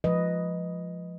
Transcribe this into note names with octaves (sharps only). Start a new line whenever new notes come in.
F3 G#3 B4 D#5